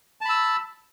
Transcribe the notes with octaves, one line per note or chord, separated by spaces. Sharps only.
A5 B5 E6